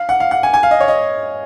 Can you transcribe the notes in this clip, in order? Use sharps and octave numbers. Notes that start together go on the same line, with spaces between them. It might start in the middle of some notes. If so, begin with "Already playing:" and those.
Already playing: F5
F#5
F5
F#5
G#5
G#5
F5
D#5
C#5
D#5